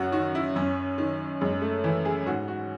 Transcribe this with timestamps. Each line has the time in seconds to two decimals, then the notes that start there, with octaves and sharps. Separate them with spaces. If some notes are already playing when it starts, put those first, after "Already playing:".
Already playing: F#2 F#4
0.12 D#3 F#4
0.35 E4
0.56 F#2 C#4
0.98 D#3
1.41 F#2 G#3
1.62 A3
1.84 E3 E4
2.05 G#4
2.26 G#2 F#4
2.48 F#4